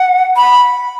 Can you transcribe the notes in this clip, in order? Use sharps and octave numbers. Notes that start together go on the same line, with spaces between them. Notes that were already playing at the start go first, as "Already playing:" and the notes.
Already playing: F#5
B5